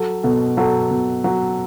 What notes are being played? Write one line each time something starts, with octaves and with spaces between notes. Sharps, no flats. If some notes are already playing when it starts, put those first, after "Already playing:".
Already playing: F#3 A4
B2 A4
F#3 A4
B2
F#3